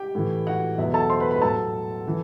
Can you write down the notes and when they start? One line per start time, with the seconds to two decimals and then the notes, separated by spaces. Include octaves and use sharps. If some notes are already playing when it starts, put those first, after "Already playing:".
Already playing: G4 G5
0.15 A2 E3
0.47 F#4 F#5
0.78 E2 B2 F#3 E5
0.94 A4 A5
1.10 C5 C6
1.20 B4 B5
1.31 B4 B5
1.41 A2 F#3 A4 A5
2.08 E3